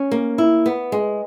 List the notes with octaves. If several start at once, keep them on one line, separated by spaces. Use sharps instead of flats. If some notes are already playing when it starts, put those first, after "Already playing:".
Already playing: C#4
A#3
E4
B3
G#3